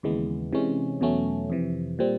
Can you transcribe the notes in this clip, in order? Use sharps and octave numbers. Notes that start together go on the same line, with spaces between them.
D#2 C#3 E3 G#3 B3
C3 E3 G#3 C#4
E2 B2 F#3 A3 C#4
F2 C3 E3
A#2 G3 C4